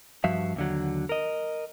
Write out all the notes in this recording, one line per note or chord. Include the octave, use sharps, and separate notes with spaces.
G2 F3 F#4 E5 F5
D#2 D3 F#3
A#4 D#5